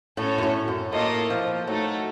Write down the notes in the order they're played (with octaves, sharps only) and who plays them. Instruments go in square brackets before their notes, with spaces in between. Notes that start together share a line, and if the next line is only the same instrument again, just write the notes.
[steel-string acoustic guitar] A2 [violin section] C#4 F#4 A4 C#5
[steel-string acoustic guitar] F#2
A2
F#2
[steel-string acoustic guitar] A2 [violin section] A#3 F4 A4 D#5
[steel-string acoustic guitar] F3
[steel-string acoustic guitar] F#3 [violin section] A3 D#4 A4